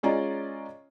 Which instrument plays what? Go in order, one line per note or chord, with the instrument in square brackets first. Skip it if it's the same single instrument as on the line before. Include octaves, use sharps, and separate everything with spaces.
[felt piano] G#3 C#4 F4 D5 D#5 A#5